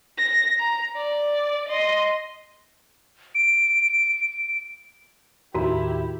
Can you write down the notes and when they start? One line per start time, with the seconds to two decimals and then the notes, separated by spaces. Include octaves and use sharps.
0.18 A#6
0.59 A#5
0.96 D5
1.68 D#5 C6
3.34 D7
5.54 D#2 A2 D#3 E4 F#4 G4 A#4 A#5